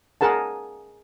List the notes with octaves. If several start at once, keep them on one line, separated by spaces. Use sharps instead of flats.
G#4 A#4 F#5 A5